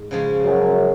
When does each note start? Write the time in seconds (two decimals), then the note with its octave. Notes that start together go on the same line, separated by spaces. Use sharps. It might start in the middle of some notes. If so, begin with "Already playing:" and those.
Already playing: G#2
0.11 C#3 F3 G#3 C#4
0.44 F#2 F#3